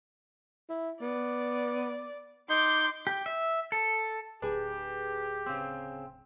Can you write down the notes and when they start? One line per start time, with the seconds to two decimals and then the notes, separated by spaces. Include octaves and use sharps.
0.70 E4
1.01 B3 D5
2.50 D#4 C6 D6 G6
3.07 G4
3.26 E5
3.72 A4
4.42 D1 D4 G4 G#4 B4
5.46 C#3 C4